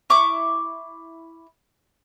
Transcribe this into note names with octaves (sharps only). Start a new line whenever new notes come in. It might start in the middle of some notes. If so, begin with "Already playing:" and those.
E4 C#6 D6